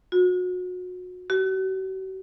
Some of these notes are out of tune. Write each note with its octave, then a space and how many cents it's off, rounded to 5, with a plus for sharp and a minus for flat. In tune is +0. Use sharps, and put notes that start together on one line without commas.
F#4 -30
F#4 +45